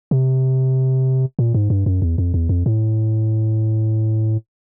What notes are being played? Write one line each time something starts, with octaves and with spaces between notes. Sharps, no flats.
C3
A#2
G#2
G2
F#2
E2
F2
E2
F2
A2